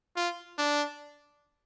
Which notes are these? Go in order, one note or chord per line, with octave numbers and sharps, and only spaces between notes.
F4
D4